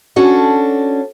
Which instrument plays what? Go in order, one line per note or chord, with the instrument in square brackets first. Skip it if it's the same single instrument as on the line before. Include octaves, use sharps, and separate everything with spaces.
[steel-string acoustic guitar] C#4 D4 F#4 A4